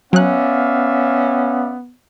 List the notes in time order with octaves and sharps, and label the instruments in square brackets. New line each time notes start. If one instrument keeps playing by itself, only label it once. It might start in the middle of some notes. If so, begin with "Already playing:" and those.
[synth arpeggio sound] F#3 F#6 [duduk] B3 [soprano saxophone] C#4 [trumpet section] D5 E5 F5